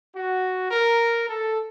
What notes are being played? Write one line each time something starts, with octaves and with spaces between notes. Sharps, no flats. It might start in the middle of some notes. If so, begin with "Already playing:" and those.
F#4
A#4
A4